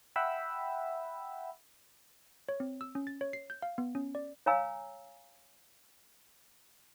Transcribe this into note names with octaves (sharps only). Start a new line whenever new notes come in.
E5 F#5 G5 B5 E6
C#5
C4
E6
C#4
A6
C#5
C7
G6
F5
B3
C#4
D5
C#5 F5 G#5 A#5 E6